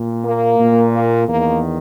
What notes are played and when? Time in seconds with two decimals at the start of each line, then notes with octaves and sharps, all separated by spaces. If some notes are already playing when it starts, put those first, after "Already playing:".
Already playing: A#2
0.25 A#3
0.60 A#2
0.94 A#3
1.28 E2 D#3 A#3